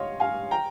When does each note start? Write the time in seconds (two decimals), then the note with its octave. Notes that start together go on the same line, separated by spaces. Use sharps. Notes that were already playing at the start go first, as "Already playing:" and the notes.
Already playing: C#5 D#5 F5 C6
0.20 F5 G#5
0.51 G5 A#5